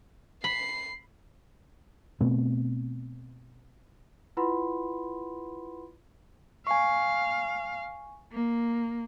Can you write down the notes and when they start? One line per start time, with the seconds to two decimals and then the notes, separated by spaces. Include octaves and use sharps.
0.44 B5 C7
2.21 B2 A3 B3 C4
4.37 E4 F4 B4 F#5 B5 C6
6.67 F5 G#5 C#6
8.33 A#3